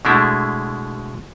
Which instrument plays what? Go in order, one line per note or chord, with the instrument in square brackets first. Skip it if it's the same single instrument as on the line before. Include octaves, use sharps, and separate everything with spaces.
[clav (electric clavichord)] B2 D3 G#3 A3 D4 E4